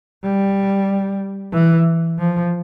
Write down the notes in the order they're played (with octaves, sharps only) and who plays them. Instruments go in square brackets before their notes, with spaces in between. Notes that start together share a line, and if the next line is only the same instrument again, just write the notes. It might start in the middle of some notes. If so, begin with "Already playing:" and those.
[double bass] G3
E3
F3